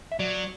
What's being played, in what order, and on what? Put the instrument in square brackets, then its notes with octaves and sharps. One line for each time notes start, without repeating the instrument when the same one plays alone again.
[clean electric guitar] E5
[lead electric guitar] F#3 [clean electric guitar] D5